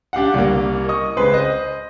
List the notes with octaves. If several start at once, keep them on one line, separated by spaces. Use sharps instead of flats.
D4 G4 F5 F#5
C2 G3 A#3
D#5 C#6 D#6
C#2 C#3 C4 B4 C6
C5 D#5